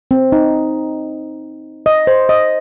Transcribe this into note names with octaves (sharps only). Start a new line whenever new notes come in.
C4
D#4
D#5
C5
D#5